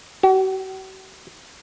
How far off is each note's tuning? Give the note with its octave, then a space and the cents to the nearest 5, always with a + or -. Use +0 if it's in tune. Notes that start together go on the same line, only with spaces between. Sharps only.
F#4 +45